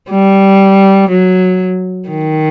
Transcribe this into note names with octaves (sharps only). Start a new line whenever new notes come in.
G3
F#3
D#3